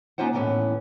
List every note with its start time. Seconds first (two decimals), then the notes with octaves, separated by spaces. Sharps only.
0.18 A#3 C#4 D#4 F4 C5 F#5
0.33 D#2 A2 E3 G#3 B3 C#4